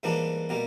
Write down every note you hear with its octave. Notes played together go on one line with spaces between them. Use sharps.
G#2 E3 G3 A#3 D4
B2 G3 A#3